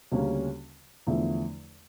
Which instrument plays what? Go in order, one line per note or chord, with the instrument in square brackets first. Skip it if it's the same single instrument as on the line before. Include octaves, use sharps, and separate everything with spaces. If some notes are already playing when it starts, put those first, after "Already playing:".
[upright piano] D2 C#3 G3 A#3 C#4
E2 D3 F3 A3 E4